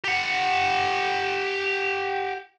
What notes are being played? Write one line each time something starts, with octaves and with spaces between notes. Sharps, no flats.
G4 F#5